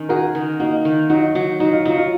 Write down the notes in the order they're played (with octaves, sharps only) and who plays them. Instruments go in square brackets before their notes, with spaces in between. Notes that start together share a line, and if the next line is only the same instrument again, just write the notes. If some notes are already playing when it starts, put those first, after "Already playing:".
Already playing: [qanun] D#3 C#4
[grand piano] F#4 A#4 [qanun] G#4
[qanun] D#3
[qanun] A#3 [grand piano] D#4 F#4
[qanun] D#3
[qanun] F#3 [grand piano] D#4 F#4
[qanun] F#3
[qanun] F#3 [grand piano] D#4
[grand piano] F4
[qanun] F#3 [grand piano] D#4
[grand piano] F4